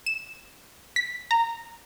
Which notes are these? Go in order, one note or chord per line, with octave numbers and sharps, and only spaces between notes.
E7
B6
A#5